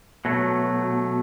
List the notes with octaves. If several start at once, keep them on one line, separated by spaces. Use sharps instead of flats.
B2 F#3 A3